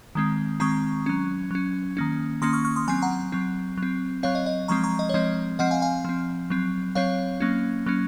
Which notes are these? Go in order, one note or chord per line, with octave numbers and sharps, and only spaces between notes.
D#3 G#3 C4
D#3 G#3 C4 A#5 C#6
F#3 C#4
F#3 C#4
D#3 A#3 C#4
D#3 A#3 C#4 C6 D#6
C#6 F6
C#6 F6
C6 D#6
F#3 C4 G#5 C6
F#5 A#5
F#3 C4
F#3
C4
F#3 C4 C#5 F5
D#5
D#5
F3 G#3 C4 A#5 C#6
A#5 C#6
D#5
C#5
F3 G#3 C4 D#5
F3 C4 D#5 F#5
F5 G#5
F5 G#5
F3 C4
F#3 C4
F#3 C4 C#5 F5
F#3 A#3 C#4
F#3 A#3 C#4